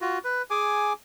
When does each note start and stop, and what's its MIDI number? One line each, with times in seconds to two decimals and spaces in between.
0.01 0.19 65
0.01 0.19 66
0.24 0.42 71
0.50 0.93 68
0.50 0.93 80
0.50 0.93 86